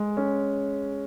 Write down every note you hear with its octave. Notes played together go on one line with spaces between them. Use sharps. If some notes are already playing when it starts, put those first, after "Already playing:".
Already playing: G#3
C#4